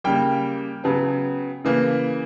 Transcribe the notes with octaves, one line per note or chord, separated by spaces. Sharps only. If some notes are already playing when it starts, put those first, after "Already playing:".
C#3 G3 A#3 G5
C#3 F#3 B3
C#3 E3 A#3